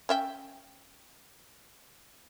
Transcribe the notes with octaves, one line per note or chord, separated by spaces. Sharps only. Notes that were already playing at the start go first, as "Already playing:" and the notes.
C#4 E5 G5